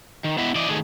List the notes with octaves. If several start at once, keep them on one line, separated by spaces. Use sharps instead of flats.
D#3
B3 E4 D#5 E5
E3 D5 D#5
D#3 A3 G#4